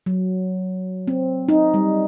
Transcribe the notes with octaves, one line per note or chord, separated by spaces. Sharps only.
F#3
C4
D#4
G3